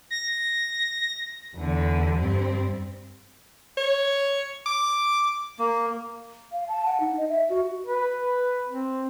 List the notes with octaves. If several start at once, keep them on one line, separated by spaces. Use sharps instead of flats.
A#6
E2 D3
G2 C4
C#5
D6
A#3
F5
A5
F#5
D#4
D#5
E5
F#4
B4
B4
C4